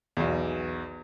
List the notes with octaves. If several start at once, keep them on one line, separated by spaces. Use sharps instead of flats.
B1 E2